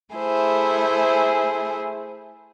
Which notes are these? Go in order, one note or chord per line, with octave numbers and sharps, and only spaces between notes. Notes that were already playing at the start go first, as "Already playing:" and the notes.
A3 E4 G#4 C5